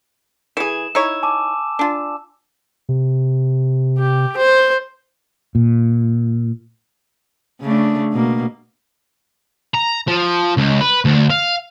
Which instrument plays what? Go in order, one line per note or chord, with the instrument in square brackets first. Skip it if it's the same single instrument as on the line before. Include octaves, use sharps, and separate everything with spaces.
[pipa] E3 G#4 [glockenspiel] E7
[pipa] D#4 E4 C#5 [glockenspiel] E6
[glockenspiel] G#5 A5 D6
[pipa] D4 F4
[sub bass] C3
[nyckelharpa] G4
C5
[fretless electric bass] A#2
[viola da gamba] C#3 A3 D4
B2 A#3
[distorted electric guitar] A#5
F3
C#2
B4
D2
F5